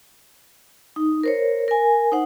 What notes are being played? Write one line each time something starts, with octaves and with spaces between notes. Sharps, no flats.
D#4
A#4 C5 C#5
A#4 G#5
D#4 C5 F#5